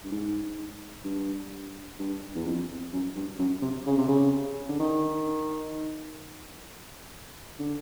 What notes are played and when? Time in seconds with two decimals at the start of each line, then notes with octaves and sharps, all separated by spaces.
0.04 G2
0.12 G#2
1.05 G2
1.99 G2
2.35 E2
2.46 F2
2.93 F#2
3.16 G2
3.39 F#2
3.62 C3
3.86 C#3
3.97 C3
4.08 C#3
4.69 D3
4.80 D#3
7.59 D3